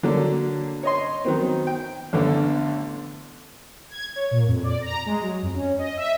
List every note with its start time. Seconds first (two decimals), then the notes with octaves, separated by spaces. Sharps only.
0.03 D3 F#3 A#3 D4
0.83 C#5 D#5 C6
1.25 D#3 F#3 B3 C4
1.67 G5
2.13 A1 D3 B3 D4
3.90 G#6
4.16 C#5
4.31 A#2
4.47 F2
4.63 D5
4.82 A#5
5.06 G#3
5.22 F#3
5.42 F2
5.54 C#4
5.78 D#5
5.97 E5